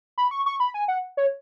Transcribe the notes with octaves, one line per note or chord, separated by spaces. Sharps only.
B5
C#6
C#6
B5
G#5
F#5
C#5